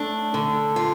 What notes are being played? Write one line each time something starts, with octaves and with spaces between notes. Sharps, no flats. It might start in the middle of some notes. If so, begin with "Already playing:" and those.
Already playing: A3 D4
D3
F4